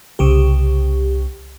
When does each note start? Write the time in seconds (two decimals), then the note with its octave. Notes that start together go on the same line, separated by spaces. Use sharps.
0.19 C2 C#3 G4